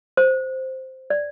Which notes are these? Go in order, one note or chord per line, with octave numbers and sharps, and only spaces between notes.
C5
D5